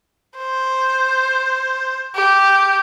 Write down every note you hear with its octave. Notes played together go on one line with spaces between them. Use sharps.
C5
G4